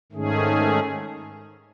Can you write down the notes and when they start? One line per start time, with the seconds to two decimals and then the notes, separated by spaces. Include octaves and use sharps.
0.12 G#2 D#3 A3 C#4 G#4